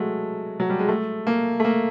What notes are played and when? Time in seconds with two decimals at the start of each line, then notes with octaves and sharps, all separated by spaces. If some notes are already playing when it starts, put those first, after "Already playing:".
Already playing: F#3 G#3 A3
0.60 F#3
0.70 G3
0.79 G#3
0.88 A3
1.27 A#3
1.60 A3
1.64 A#3